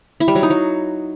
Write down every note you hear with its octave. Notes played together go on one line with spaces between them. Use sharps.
E4
G3
F#3
D#4
F#3